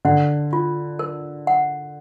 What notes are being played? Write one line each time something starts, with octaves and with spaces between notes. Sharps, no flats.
D3 F#5
F4
A#4
F#5